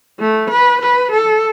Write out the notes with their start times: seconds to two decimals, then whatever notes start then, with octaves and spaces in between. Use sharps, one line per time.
0.20 A3
0.50 B4
0.81 B4
1.12 A4